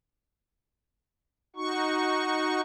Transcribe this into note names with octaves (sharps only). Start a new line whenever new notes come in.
D#4 F#4 C#6